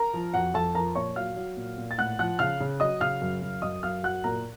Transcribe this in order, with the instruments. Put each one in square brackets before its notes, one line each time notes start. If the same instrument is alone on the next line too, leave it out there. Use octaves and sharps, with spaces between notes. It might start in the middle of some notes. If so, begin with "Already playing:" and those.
Already playing: [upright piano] A#4 A#5
F3
F2 F#4 F#5
F2 A4 A5
F3 A#4 A#5
A#2 C#5 C#6
F#3 F5 F6
F#3
A#2
A#2
A6
A2 F#5 F#6
F3 F#5 F#6
C#3 F5 F6
C#3
F#3 D#5 D#6
C#3 F5 F6
F#2
F#2
F#2 D#5 D#6
F#2 F5 F6
F#3 F#5 F#6
A#2 A#4 A#5